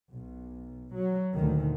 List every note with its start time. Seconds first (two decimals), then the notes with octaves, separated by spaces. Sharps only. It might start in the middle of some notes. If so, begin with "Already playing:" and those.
0.13 B1
0.94 F#3
1.34 D2 A#2 D#3